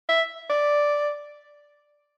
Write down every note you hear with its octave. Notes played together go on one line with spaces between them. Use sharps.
E5
D5